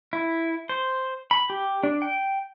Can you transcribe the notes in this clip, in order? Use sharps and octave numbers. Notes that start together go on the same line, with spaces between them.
E4
C5
B5
G4
D4
G5